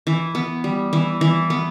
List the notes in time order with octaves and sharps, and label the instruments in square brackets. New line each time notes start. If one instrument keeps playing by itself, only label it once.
[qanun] E3
B3
G3
E3
E3
B3